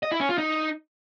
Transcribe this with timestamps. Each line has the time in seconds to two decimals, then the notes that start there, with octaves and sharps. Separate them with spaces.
0.03 D#5
0.12 E4
0.20 C#4
0.29 F4
0.38 D#4